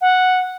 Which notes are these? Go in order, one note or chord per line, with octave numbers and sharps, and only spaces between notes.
F#5